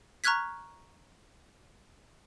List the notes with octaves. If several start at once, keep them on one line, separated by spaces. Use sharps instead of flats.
A#5 C#6 F6 F#6 G#6 B6